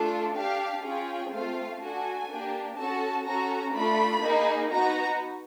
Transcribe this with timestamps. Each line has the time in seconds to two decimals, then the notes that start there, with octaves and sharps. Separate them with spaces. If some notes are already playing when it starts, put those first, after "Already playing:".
Already playing: A3 D4 F4 A4
0.35 D4 G4 F5
0.84 C#4 F4 G#4 G5
1.32 A3 C4 F4 F5
1.81 D4 F#4 A4 G#5
2.29 A#3 D4 G4
2.78 C#4 F#4 A4 A5
3.25 C#4 F#4 A4 A#5
3.74 A3 D4 F4 B5
4.23 A#3 D#4 G#4
4.71 B3 D#4 F#4 A#5